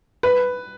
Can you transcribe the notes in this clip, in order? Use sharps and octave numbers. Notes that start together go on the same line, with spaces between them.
B4